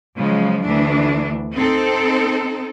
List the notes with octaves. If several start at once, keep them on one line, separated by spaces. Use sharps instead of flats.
C#3 F3 F#3 G#3
D2 E3 D4
C4 D#4 A4